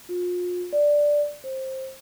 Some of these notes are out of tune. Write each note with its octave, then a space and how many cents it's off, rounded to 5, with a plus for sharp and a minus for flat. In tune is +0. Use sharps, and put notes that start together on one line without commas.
F4 +35
D5 +0
C5 +15